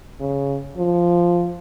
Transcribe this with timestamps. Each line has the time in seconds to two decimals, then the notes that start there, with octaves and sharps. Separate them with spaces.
0.20 C#3
0.77 F3